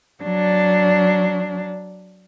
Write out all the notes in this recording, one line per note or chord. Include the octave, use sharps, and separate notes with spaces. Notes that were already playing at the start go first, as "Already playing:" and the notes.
F#3 D4